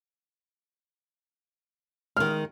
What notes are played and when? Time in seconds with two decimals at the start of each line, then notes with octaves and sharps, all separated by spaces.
2.17 D#3 G#3 F6